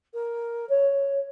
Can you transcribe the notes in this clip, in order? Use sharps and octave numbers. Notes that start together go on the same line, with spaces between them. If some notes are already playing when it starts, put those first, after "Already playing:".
A#4
C#5